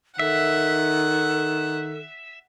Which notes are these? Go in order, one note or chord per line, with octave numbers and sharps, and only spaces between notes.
D#3 A4 E5 F#5